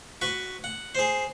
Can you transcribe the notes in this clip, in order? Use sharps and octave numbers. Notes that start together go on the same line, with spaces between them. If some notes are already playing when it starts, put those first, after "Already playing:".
F#4 B4 C#6
F#5
G#4 C5